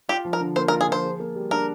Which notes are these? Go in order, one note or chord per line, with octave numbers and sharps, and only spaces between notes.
F4 G4
F3
A#4
D3
A#3 C5
A#4
F4
G#4
F3 C5
G#4
A#3
G3
D4 A#4